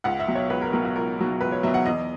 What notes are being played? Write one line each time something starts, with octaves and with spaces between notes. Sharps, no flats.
C#2 F#5
E5
B2 F#3
C#5
C#2 B4
A#4
B2 F#3 A#4
F#4
C#2 A#4
B2 F#3
C#2 B4
C#5
B2 F#3 E5
F#5
E2 D#5